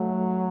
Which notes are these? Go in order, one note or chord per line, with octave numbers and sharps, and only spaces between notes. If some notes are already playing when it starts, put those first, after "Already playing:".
Already playing: F#3 A3